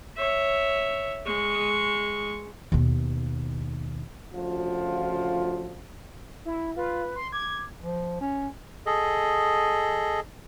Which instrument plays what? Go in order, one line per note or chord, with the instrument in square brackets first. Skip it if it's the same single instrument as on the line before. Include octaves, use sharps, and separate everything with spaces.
[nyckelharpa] C#5 E5
G#3 C#6
[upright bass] D#2 B2
[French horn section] D2 C#3 F3 F4 F#4
[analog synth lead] E4
[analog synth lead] F4 [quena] B4
[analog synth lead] C6
[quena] D6 [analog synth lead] G#6
[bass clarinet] F3
C#4
[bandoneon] G#4 A4 D#5